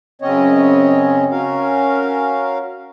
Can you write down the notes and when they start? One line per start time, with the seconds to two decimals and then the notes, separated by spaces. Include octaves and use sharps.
0.22 F#2 C#3 C4 C#4 C#5 D#5
1.30 C#4 F#4 A#4 F5